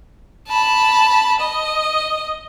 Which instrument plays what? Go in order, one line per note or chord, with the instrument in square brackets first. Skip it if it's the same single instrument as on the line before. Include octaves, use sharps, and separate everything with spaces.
[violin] A5 B5
D#5